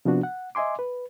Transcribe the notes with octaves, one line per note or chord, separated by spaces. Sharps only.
C3 F3 B3 D4 F#4
F#5
D#5 E5 G#5 C6 D6
B4